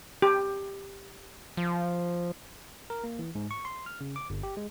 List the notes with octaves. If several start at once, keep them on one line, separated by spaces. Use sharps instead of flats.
G4
F3
A#4
A#3
E3
G#2
C#6
C6
F6
C#3
D6
G1
G4
G#3